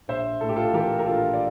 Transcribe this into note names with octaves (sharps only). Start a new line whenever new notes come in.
A#1 C5 E5
A2 A4
G4
F4 A4
E3 G4 A#4
A#4
A#1 F4 A4
D5